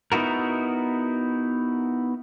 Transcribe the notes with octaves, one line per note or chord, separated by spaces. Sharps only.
B3 D#4 E4 F#4 A#4